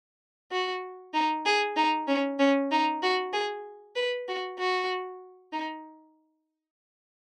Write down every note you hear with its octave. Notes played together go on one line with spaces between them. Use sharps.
F#4
D#4
G#4
D#4
C#4
C#4
D#4
F#4
G#4
B4
F#4
F#4
D#4